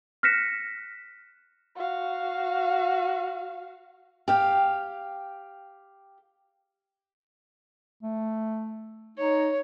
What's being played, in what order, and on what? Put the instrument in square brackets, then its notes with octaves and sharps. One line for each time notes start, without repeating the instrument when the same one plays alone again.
[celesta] F6 F#6 A#6 B6 C#7 E7
[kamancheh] F#4 F5
[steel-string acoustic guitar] G4 F5 G5
[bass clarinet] A3
[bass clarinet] D#4 [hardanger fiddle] C#5